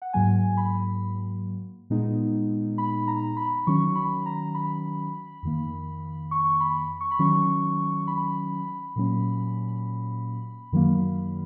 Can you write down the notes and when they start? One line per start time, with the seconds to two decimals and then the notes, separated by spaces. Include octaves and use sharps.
0.02 F#5
0.13 G#2 F#3 A#3 G#5
0.57 B5
1.90 A#2 G#3 B3 D#4
2.78 B5
3.08 A#5
3.37 B5
3.67 D#3 F#3 C#4 C#6
3.95 B5
4.26 A#5
4.55 B5
5.43 F2 D#3 A#3
6.31 C#6
6.60 B5
7.01 C#6
7.11 B5
7.19 D#3 F#3 C#4 C#6
8.08 B5
8.96 A#2 F#3 A#3 C#4
10.72 F#2 D#3 F#3 A#3